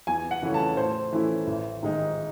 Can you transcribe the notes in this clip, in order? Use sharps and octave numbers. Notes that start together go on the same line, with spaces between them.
E2 G#5
F#5
C#3 E3 A3 C#4
A5
A2 C5
E3 A3 C#4 E4
A1
G#2 D#3 G#3 D#4